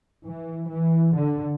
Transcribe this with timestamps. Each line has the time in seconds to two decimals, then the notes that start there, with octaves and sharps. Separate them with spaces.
0.25 E3
0.70 E3
1.15 D3